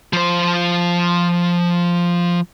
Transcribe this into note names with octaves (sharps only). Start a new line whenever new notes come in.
F3 C5